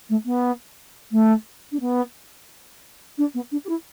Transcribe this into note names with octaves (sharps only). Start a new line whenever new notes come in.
A3
B3
A3
D4
B3
D4
B3
D4
G4
E4